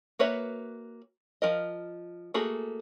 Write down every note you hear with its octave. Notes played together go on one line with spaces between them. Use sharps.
A#3 F#4 B4 C#5 E5
F3 A#4 D#5
A3 A#3 F#4 G#4 A4